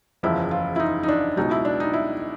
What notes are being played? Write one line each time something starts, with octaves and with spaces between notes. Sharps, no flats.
F#1 E2 C#3 F3 E4
F4
E4
D#4
D#4
D4
C#2 B2 F#3 D#4
E4
D4
D#4
E4